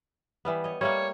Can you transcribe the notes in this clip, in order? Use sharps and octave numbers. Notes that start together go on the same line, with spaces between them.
E3 G3 B3
C#5 D#5
G3 A3 A#3 C#5